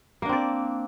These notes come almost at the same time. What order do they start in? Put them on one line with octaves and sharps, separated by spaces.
A#3 D4 C4 D5